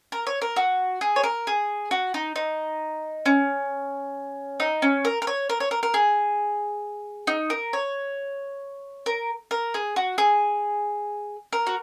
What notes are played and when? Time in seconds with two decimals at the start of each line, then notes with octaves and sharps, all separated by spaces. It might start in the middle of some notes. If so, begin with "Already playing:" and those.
0.12 A#4
0.27 C#5
0.41 A#4
0.56 F#4
1.01 G#4
1.16 C#5
1.24 A#4
1.47 G#4
1.91 F#4
2.14 D#4
2.36 D#4
3.26 C#4
4.60 D#4
4.82 C#4
5.05 A#4
5.22 A#4
5.27 C#5
5.49 A#4
5.60 C#5
5.71 A#4
5.83 A#4
5.94 G#4
7.27 D#4
7.50 A#4
7.73 C#5
9.06 A#4
9.51 A#4
9.74 G#4
9.96 F#4
10.18 G#4
11.53 A#4
11.67 F#4